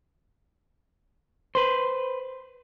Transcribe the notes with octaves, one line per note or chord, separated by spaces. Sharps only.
B4 C5